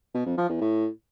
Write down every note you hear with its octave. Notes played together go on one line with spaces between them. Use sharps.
B2
F2
F3
E2
A2